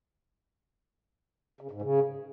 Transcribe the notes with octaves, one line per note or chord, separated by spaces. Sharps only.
C#3
G#2
C#3